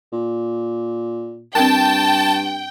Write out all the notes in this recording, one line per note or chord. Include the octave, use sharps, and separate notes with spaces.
A#2
G2 C4 D4 A#4 G5 A5